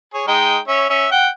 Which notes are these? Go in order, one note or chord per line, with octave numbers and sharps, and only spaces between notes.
G#4 C#5
G#3 D#4 G5
C#4 C#5 E5
C#4 E5
F#5 G5